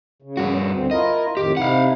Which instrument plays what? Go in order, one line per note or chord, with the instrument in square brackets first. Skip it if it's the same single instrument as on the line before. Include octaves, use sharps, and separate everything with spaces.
[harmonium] C#3
[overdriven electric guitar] G2 F#4
[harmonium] D2 D3 C4
[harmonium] E4 F4 A#4 [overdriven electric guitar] D#5
[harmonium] F2 A2 D#3 [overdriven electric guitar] G4
[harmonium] C3 D#4 E4 [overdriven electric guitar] F5 F#5